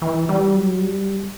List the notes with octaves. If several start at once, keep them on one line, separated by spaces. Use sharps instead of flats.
E3
G3
F#3
G3